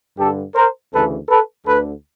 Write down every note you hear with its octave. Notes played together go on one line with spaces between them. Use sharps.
G2 D3 G4 A4
A#4 C5
D2 C#3 E3 A4 B4
A4 B4
D2 D3 A4 B4